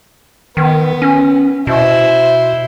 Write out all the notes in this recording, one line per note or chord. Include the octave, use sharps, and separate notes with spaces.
D#3 B3
C#4
B2 E4 C5